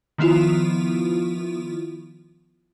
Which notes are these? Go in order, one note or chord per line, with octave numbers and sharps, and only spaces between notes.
D#3 F3 B3 E4 F4